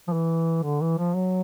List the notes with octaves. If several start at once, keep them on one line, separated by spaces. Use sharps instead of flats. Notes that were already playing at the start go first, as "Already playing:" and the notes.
F3
E3
D3
E3
F3
F#3